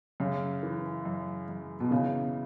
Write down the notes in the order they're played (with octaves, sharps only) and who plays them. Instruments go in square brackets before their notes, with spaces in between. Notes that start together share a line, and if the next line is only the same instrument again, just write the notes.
[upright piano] F#2 [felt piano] C#3
[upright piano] E3
F#2
F#2
[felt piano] B2
[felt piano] C#3 [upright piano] E3